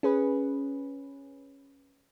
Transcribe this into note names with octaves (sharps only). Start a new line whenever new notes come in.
C#4 G#4 B4